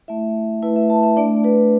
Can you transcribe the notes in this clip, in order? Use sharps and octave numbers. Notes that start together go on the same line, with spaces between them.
A3 E4 E5
A3 E4 B4
E5
A5
E5
A3 D4 D5
B4